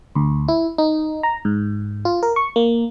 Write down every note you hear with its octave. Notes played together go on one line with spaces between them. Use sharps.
D2
E4
D#4
A#5
G#2
F4
A#4
C#6
A#3